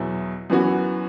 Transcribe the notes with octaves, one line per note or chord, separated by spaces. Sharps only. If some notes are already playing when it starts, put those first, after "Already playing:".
Already playing: E2 B2 F#3 B3 E4
F#2 E3 B3 F#4